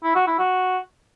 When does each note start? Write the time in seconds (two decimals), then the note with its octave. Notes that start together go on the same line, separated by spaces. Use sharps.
0.03 E4
0.15 F#4
0.27 E4
0.39 F#4